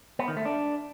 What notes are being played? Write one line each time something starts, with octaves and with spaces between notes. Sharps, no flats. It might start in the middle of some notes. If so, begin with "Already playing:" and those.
B3
D#3
A3
D4